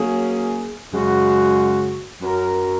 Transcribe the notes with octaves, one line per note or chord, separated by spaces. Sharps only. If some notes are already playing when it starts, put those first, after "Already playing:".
Already playing: F#3 A#3 C#4 G#4
F#2 C#3 G#3 F#4
F#2 F#3 C#4 A#4